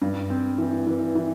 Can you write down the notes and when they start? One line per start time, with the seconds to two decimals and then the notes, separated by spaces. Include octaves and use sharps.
0.01 G2
0.30 C4
0.58 E3
0.87 E3
1.15 E3